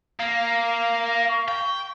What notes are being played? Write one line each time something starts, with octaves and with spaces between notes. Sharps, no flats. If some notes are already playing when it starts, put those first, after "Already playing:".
A#3 F5
C#6
G5